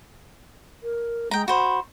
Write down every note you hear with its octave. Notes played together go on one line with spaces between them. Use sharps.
A#4
G#3 G5 A#5
F#4 C5 B5